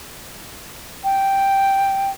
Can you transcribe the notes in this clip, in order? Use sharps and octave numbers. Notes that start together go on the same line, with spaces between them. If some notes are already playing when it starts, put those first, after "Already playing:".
G5